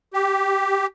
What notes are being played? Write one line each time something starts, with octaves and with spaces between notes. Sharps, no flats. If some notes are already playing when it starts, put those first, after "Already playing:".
G4